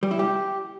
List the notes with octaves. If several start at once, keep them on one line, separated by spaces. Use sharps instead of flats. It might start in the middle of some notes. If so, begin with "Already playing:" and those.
G3
E4
G4